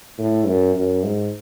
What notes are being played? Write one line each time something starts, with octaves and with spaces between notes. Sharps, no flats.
A2
F#2
F#2
G#2